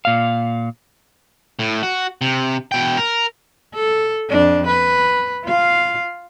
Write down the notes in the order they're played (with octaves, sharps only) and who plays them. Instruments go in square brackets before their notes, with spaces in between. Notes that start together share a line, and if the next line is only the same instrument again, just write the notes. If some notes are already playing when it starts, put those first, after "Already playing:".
[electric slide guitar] A#2 F5
[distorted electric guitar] A2
F#4
C3
B2 G5
A#4
[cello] A4
F2 D4
B4
F4 F5